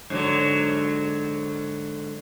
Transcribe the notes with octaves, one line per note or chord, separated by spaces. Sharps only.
G#2 D3 F#3